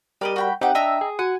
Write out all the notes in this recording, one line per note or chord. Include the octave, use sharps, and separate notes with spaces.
G3 G4 A#4 D5 D#5
F#4 G5 B5
C4 D#4 G4 F#5 G5 D6
D4 D#5 E5 A#5 E6
G#4
F#4 F#5 G#5